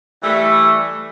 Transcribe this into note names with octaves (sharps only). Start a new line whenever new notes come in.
E3 G3 A3